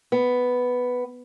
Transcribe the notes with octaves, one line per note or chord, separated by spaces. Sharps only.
B3